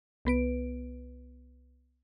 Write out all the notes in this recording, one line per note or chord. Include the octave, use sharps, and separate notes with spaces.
C2 B3 B4 D7